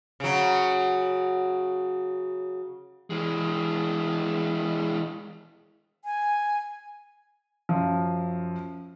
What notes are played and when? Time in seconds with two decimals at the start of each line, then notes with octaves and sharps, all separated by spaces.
0.20 C#3 F#3
3.10 E3 G#3
6.05 G#5
7.69 F#2 F3